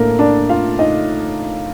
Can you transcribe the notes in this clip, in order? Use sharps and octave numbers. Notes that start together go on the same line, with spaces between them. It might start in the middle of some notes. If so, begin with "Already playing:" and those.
Already playing: A2 A3 A#3 D4 A4 A#4
D4 D5
F4 F5
D#4 D#5